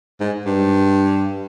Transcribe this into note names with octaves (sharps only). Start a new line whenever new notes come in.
G#2
G2